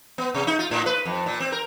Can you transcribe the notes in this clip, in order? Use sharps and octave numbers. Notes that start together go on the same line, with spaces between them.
B3
C3
D#4
F4
A2
B4
F2
A#2
C4
A#4